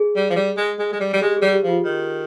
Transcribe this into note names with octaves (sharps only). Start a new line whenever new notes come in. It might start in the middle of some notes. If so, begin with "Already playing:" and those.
Already playing: G#4
G3
F3
G3
G#3
G#3
G#3
G3
G3
G#3 G4
G3 G#4
G4
F3
F4
D#3